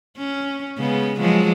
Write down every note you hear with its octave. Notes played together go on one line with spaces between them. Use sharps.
C#4
C#3 G#3 B3
F3 F#3 G#3